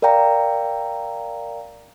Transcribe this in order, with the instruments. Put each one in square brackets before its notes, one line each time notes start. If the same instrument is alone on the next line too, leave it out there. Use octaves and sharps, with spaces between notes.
[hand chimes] A#4 D5 F5 G5 A#5